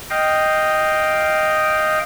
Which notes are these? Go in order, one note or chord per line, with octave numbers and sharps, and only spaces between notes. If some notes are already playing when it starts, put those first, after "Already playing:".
D#5 F5 G5